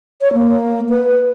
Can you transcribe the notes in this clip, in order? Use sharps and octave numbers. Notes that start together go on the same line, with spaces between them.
C#5
A#3
B4